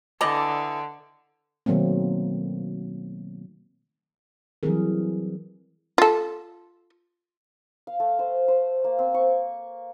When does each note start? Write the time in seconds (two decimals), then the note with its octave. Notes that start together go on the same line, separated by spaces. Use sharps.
0.21 D3 E3 D5 D#5
1.66 B2 D#3 F#3 A3 A#3 C4
4.63 E3 F#3 G3 C4 G#4 A#4
5.98 F4 A4
7.87 F5
8.00 A3
8.19 C5
8.48 C5
8.84 A#3
8.99 C4
9.14 C#6